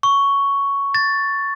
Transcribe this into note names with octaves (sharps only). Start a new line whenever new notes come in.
C#6
A6